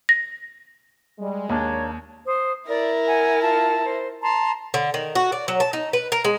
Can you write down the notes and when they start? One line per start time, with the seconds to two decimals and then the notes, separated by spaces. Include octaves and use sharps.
0.09 A#6
1.19 G3 G#3
1.49 D#2 A#3 D4 C#5
2.26 C5 D#6
2.67 E4 A#4 D5
3.06 F#5 G#5
3.41 F4 A5
3.84 C5
4.22 A5 A#5 C6
4.74 D3
4.94 D#3
5.15 F#4
5.32 D5
5.48 F#3
5.60 A5
5.73 D#4
5.93 B4
6.12 A#4
6.24 G#3